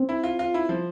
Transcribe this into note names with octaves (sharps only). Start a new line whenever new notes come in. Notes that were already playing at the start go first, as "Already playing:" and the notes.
Already playing: C4
E4
F4
F4
E4
F3